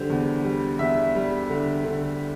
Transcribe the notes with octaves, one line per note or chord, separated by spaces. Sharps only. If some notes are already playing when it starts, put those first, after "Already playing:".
Already playing: D3 G3 C5
E2
G3
E2 E5
G3
D3
D3